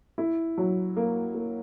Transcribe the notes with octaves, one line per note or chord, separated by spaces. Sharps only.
E4
F#3
A#3
A#3